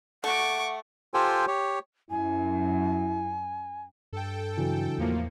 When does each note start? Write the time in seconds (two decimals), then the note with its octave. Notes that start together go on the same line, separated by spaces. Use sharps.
0.24 A3 F#5 C#6 D6
1.14 F4 G4 A4 C5 G5 G#5
1.47 G4 C#5
2.11 F#2 E4 G#5
4.13 G2 A4 G5
4.57 C#3 E3 F#3 D4
4.98 E2 A2 F3 A#3 C#7